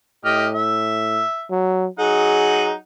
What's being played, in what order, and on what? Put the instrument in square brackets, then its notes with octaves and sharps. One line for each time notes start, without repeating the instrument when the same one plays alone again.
[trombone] A2 [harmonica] G4 D#5 F6
[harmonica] E5
[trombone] F#3
[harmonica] F#3 D#4 F#5 [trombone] G#4